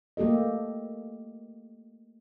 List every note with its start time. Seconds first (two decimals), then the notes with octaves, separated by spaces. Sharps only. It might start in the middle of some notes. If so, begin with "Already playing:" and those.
0.17 A3 A#3 G4 A4 D#5